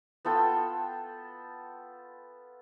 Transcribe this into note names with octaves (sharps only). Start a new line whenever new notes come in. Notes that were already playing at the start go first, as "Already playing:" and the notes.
B3 F4 A4 G5